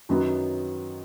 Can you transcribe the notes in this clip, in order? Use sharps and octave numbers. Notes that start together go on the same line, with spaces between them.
F#2 D#3 F#3 B3